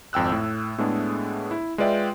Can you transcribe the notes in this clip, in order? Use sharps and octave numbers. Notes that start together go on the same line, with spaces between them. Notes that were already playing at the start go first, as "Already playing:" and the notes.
G#1 F2 G5 E6 F#6
A2
A2 G#3 A3 B3 D4 G#4
E4
G#3 F4 B4 D5 E5 G5